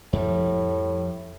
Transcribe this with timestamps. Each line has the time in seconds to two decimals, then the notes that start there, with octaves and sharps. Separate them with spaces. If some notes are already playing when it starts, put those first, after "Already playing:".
0.13 F2 A2 F3 G3